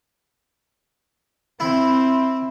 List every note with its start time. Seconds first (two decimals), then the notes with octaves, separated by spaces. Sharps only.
1.60 C4 E4